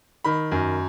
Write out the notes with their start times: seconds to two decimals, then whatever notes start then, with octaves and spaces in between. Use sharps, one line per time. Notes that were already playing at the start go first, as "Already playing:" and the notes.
0.25 D#3 B5
0.52 F#2